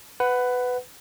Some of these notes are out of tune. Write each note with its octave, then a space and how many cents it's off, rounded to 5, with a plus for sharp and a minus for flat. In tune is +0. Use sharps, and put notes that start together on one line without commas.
B4 +15 F#5 +0